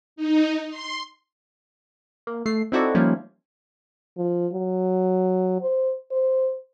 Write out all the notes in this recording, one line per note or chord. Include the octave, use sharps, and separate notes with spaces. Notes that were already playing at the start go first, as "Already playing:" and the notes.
D#4
C6
A#3
A3 C7
C4 D#4 E4 F#4 A4 D5
D#3 F3 G3 A#3 C#4 E4
F3
F#3
C5
C5